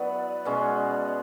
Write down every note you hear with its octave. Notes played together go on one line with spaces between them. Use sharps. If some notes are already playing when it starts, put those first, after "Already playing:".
Already playing: F#3 B3 E4 B4 D5
B2 G#3 C#4